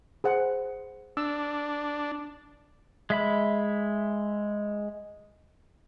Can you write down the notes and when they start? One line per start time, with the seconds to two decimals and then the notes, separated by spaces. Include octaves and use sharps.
0.24 G#4 C5 F#5
1.17 D4 E6
3.10 G#3 E5 B5